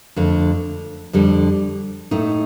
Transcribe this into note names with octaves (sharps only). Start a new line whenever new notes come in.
F2 D3 A3
F2 D3 G3
A2 A3 D#4